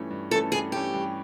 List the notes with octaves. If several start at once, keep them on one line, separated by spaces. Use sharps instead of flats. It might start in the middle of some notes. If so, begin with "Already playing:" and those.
Already playing: G2 E3 A3 C#4
G2
E3 A3 C#4 A4
G2 G#4
E3 A3 C#4 G4
G2